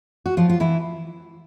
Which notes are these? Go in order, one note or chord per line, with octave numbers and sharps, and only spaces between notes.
F#4
F3 F4
F4
E3 E4